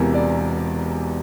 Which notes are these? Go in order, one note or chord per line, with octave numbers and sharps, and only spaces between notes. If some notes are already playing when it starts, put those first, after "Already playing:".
Already playing: E1 E2 C3 E3 A#4
D5